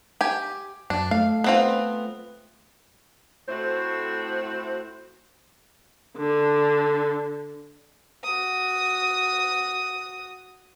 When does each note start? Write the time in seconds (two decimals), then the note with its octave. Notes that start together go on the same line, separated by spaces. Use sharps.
0.21 G4 G#5
0.90 F#2 D4
1.11 A3 F5
1.44 B3 C4 F4
3.49 A2 A3 C4 F#4 C5
6.17 D3
8.24 F#4 D#6